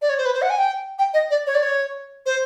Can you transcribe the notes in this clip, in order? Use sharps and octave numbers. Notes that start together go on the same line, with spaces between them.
D5
C#5
C5
B4
C5
F#5
G#5
G5
G5
D#5
D5
C#5
D5
C#5
C5